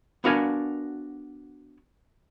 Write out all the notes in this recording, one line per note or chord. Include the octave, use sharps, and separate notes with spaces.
B3 D4 F#4 A#4 F5 G#5